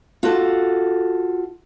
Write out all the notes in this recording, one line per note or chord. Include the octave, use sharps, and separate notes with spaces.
F4 F#4 A4